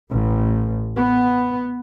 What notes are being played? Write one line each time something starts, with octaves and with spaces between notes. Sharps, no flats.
A1
B3